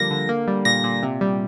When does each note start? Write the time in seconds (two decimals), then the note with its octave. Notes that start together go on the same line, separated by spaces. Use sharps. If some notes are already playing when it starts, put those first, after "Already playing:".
Already playing: D3 F3 G3 A#3 A#6
0.11 D3
0.29 A#3
0.48 G3
0.65 A#2 A#6
0.84 A#2
1.03 C3
1.21 G3